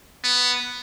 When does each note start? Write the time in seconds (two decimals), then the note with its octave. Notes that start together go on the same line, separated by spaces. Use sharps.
0.24 B3